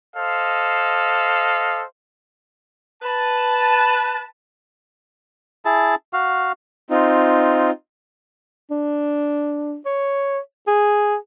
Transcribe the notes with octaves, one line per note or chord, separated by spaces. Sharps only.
A4 C5 D#5 F5
B4 A5
E4 G#4 A5
F#4 F5
C4 D#4 F4
D4
C#5
G#4